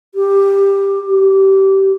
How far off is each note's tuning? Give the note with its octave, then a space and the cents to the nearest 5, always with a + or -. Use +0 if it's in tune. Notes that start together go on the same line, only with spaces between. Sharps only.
G4 +10
G4 -20